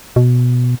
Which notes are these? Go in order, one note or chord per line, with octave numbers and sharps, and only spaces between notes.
B2